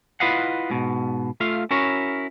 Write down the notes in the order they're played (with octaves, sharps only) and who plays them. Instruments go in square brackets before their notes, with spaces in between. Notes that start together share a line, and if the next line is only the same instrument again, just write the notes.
[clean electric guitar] E4 F4 B4 D#5 F5 F#5
G#2 B2
A3 F4 F5
C#4 E4 F#4 A#4 C#5